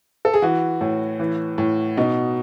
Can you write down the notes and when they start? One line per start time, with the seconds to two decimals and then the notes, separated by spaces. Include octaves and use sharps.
0.25 A4
0.34 G#4
0.42 E3 F#4
0.81 A2
1.20 E3
1.58 A2
1.97 B2 D#4